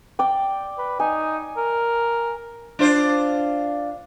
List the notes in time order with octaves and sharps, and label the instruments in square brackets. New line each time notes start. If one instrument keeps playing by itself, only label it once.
[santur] D5 G5
[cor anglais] B4
[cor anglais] D#4 [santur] G#5
[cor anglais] A#4
[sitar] D4 F4 C5